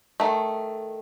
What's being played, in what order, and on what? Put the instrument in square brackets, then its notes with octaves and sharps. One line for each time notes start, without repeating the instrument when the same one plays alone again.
[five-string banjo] D#3 A3